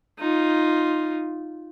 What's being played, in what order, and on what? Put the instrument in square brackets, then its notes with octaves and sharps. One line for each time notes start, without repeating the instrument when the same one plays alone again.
[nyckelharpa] D#4 F4